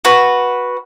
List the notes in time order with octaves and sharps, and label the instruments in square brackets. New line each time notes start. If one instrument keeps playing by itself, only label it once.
[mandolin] F#4 B4